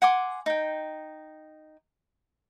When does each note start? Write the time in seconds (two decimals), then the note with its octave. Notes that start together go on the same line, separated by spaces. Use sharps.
0.02 F#5 G#5 C6 D6
0.46 D#4 G5